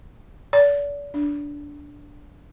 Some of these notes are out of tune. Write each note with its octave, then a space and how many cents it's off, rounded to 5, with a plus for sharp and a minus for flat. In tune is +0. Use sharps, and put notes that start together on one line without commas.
D5 -40
D4 -10